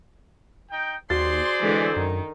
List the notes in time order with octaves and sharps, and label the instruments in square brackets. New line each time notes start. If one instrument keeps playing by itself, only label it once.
[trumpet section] D#4 G5
[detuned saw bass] D#2 [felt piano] F#4 A6 [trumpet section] G#4 C5 D5 [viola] C6
[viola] D3 E3 [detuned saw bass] G#3
[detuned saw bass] F#2 [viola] D#3